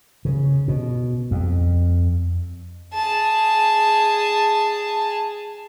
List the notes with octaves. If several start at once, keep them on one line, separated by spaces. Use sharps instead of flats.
C#3
B2
F2
G#4 A5